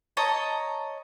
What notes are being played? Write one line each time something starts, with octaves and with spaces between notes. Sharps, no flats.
C#5 D#5 A5 A#5